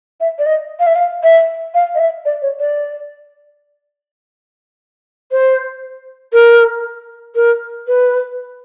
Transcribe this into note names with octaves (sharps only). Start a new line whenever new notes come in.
E5
D5
D#5
F5
E5
F5
E5
F5
D#5
E5
D5
C#5
D5
C5
A#4
A#4
B4